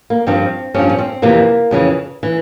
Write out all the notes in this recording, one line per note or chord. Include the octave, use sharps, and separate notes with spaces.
A#3
G2 F3 C4
G2 F3 C#4
C#4
C4
F2 C3 E3 A#3
F2 C#3 E3
E3